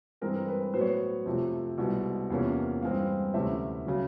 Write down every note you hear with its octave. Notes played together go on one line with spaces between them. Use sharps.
G2 E3 G#3 C4 A#4
A#4
B4
B4
A2 F#3 B3 C5
C#5
C5
F2 C3 F3 A3
C2 B2 G#3
E2 C3 F3 A#3 C#4
G2 E3 G#3 C4 F5
D2 C3 E3 A3 C#4 E5
C#3 F#3